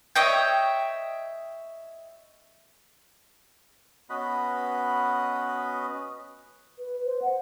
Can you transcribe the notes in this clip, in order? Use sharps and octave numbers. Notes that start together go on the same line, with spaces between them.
C#5 D#5 E5 G5
B3 C#4 F#4 B4 D#5 B5
B4
C5
F#5